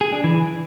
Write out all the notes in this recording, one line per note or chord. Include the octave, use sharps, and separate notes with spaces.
G#4
D4
E3